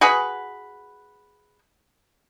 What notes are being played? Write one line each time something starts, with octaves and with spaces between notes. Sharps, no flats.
F#4 G#4 B4